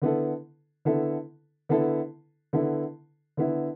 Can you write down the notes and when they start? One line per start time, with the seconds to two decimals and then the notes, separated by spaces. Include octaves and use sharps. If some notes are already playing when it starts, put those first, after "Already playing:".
0.02 D3 B3 E4 A4
0.85 D3 B3 E4 A4
1.69 D3 B3 E4 A4
2.53 D3 B3 E4 A4
3.37 D3 B3 E4